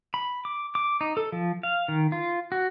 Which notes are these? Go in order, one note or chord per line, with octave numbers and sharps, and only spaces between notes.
B5
D6
D6
D#4
A4
F3
F5
D#3
F4
F#4